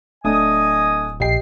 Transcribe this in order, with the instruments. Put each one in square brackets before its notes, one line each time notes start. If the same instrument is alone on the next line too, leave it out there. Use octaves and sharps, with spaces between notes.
[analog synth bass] D1 [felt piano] A3 D4 [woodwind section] D#5 G#5 D#6
[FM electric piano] A#1 C7 [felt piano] G4 D#5 G5